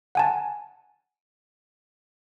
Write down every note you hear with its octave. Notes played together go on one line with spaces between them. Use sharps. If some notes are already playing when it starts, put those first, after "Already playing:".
F#5 G#5 A5